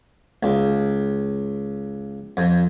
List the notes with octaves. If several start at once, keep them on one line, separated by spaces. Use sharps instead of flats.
C#2
F2